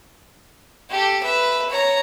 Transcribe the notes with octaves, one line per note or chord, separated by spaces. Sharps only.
G4 A4
B4 E5
C#5 A#5